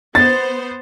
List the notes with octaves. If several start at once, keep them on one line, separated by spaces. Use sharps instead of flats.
B3 C5 A6